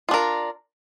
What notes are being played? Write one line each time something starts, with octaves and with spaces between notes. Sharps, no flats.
D4 F4 A#4